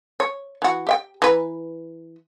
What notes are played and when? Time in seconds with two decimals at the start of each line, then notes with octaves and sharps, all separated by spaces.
0.20 C#5
0.62 E3 F#4
0.87 G4 E5 G5
1.22 E3 B4 A#5